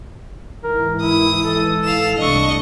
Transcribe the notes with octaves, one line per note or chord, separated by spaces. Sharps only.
G#2 E3 A#4
E4 D#6
A4
F5 E7
C2 A3 D4 D#5 C#6